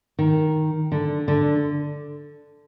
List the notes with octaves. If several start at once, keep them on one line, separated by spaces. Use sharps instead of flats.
D#3
D3
D3